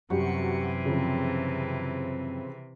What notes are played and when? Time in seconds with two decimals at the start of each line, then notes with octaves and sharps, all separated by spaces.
0.10 F#2 C3 E3 G3 F#4 C#7
0.86 C#3 F3 C4